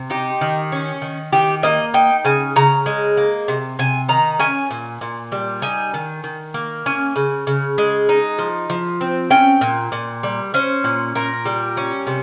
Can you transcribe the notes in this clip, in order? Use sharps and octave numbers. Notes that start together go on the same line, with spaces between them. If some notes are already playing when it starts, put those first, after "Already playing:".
Already playing: C3
D#4 G4
D#3
C#4
D#3
D#3 G4
A#3 D#5
D#4 G5
C#3 G#5
C#3 A#5
G#3
A#3
C3
C3 G#5
D#3 A#5
C#4 G#5
A#2
A#2
G3
D#4 G#5
D#3
D#3
A#3
C#4 G#5
C#3
C#3
G#3
D#4
F3
F3
C4
C#4 G5
A#2
A#2
G3
C#4 C5
A#2
A#2 A#4
G3
C#4
C3